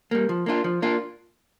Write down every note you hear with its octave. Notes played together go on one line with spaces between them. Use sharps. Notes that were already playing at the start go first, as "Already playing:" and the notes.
G3 A#3
F3
A#3 D4 F4
F3
A#3 D4 F4